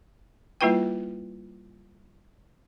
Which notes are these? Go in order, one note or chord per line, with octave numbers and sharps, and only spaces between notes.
G3 A#3 E4 F4 B4 G5